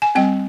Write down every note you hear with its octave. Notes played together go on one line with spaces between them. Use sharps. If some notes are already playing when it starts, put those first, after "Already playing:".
G#5
G3 C4 G5